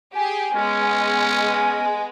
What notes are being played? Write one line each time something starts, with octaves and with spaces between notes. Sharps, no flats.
G4 G#4 G#5
G#3 B3 C#4